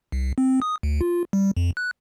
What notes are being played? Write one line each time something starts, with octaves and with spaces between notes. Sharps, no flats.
C2
C4
D#6
D2
F4
G3
F2
F#6